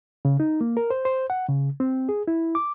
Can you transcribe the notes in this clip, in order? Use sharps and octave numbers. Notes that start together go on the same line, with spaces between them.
C#3
D#4
A#3
A#4
C5
C5
F#5
C#3
C4
G#4
E4
D6